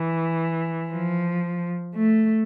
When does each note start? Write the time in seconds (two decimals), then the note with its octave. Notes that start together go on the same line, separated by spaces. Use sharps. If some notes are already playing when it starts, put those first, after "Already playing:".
Already playing: E3
0.91 F3
1.95 A3